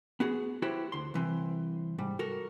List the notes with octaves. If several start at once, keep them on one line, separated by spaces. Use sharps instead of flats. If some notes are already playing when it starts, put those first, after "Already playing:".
B3 F#4 G#4
E4 F#4 G4 B4 C5
D2 C6
C2 E3 C4
G#2 G3
F#4 A4 A#4